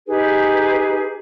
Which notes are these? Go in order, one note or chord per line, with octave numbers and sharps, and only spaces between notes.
D#4 G4 G#4 B4